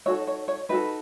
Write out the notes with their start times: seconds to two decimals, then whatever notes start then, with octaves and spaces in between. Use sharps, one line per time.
0.06 D#4 F#4 A4 C#5 E5
0.27 C#5
0.48 C#5
0.69 D#4 F#4 A4 B4